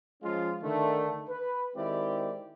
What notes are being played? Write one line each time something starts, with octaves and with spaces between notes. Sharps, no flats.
F3 G#3 C#4 F4
D3 D#3 A3
B4
D#3 G#3 C4 E4 G4 D5